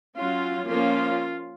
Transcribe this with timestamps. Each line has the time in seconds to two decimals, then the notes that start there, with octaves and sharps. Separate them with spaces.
0.18 F#3 C#4 F4
0.69 F3 A#3 C#4 F4